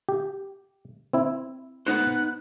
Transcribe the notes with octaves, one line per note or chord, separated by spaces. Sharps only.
G4
C4 E4
B3 D#4 C5 F#6